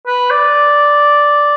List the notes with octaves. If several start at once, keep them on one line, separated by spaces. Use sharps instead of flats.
B4
D5